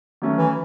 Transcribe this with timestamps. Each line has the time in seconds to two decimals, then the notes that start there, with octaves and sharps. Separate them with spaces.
0.22 D#3 F#3 A3 C#4
0.38 E3